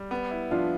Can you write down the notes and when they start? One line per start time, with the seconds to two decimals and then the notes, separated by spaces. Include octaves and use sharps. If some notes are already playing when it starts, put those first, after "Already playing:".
Already playing: G3
0.11 B3
0.31 E4
0.51 F3 D4 F4